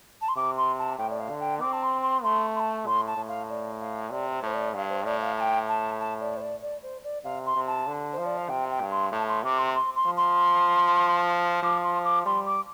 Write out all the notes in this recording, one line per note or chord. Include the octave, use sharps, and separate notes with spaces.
A5
C6
C3 D6
C6
A5
A2 G5
D5
F5
D3
G5
C4 D6
A5
C6
C6
A3 C6
C6
A5
A2 C6
A5
A2
F5
D5
F5
C3 D5
C5
A2 C5
D5
G2 F5
C5
A2 D5
F5
A5
G5
A5
A5
D5
C5
D5
D5
C5
D5
C3 F5
C6
C3
A5
D3
C5
F3
D5
F5
C3 G5
G5
G2
C6
A2 A5
C6
C3 D6
C6
C6
C6
F3
C6
F3 D6
C6
D6
G3 C6
D6